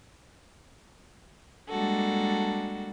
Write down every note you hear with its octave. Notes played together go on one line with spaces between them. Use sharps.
G3 G#3 A#3 D4 F#4 A4